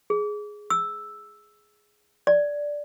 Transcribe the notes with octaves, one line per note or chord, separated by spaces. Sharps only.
G#4
E6
D5